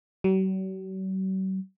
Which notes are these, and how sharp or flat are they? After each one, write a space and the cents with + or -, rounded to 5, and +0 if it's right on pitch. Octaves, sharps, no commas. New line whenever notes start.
F#3 +45